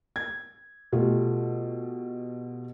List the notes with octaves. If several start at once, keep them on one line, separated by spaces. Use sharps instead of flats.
G#6
B2 A3 F4 G4